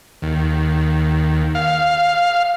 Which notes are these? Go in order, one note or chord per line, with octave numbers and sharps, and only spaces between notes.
D#2
F5